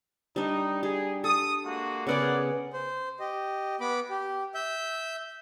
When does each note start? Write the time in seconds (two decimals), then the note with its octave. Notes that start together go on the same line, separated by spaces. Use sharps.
0.36 G3 D4 D#4
0.83 G4 G#4
1.24 A4 D#6
1.64 G#3 A#3 F#4
2.07 C#3 B3 G#4 A#4 D5 F#5
2.73 C5
3.20 G4 D#5
3.81 B3 B5 D6
4.09 G4
4.55 E5 G6